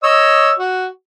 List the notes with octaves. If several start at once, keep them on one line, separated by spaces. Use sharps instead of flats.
C#5 D#5 E6
F#4